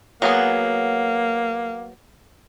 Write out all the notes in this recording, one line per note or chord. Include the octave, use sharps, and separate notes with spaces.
F#3 A#3 B3 G#4